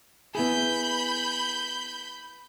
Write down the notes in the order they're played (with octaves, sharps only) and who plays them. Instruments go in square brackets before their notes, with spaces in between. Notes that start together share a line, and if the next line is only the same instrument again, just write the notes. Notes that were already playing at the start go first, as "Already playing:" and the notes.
[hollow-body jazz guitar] B3 E4 G#4 [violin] B5 G6